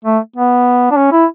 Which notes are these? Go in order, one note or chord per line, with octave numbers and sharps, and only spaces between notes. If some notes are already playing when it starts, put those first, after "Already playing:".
A3
B3
D4
C#4
E4